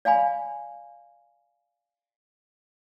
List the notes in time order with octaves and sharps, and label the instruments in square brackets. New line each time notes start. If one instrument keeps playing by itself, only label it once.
[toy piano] D5 F5 G#5 B5